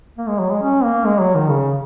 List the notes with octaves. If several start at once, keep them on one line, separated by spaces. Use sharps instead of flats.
A#3
G#3
F#3
G#3
C#4
A#3
G#3
F#3
D#3
C#3